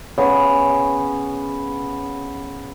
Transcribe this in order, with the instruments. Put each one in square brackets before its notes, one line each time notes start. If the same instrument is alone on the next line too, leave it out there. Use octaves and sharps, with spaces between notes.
[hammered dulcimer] C#3 B3 [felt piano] C#5